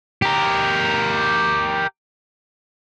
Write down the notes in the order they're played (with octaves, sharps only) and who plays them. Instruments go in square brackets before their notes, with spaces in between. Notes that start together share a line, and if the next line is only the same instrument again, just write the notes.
[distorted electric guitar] G4 A#4